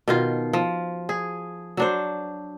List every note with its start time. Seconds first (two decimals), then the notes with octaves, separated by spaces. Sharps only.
0.08 B2 D#3 F4
0.53 F3
1.09 G#4
1.77 F#3 D4 C5